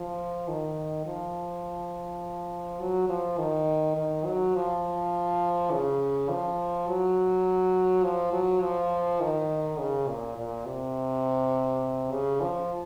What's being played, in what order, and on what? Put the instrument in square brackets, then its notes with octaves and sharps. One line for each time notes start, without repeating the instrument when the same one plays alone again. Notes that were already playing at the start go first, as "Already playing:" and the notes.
Already playing: [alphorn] F3
D#3
F3
F#3
F3
D#3
D#3
F#3
F3
C#3
F3
F#3
F3
F#3
F3
D#3
C#3
A#2
A#2
C3
C#3
F3